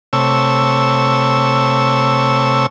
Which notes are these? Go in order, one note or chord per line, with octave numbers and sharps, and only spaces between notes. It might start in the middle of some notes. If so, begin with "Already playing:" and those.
C3 A3 C#5 E6